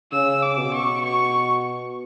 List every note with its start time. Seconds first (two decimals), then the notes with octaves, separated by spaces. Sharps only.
0.12 C#3 E6
0.42 D6
0.58 B2
0.74 C#6
1.04 C#6